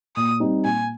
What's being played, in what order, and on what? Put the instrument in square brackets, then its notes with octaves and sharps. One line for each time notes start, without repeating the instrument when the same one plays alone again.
[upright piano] A#2 [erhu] D#6
[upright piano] G3 C4 D#4
[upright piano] A#2 [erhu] G#5